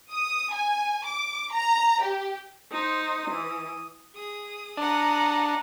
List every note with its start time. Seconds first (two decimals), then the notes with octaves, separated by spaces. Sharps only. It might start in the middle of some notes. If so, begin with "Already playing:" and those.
0.11 D#6
0.54 G#5
1.06 D6
1.52 A#5
2.03 G4
2.72 D#4 C5 D#6
3.31 E3
4.14 G#4 D#6
4.77 D4 F#5 A#5 D#6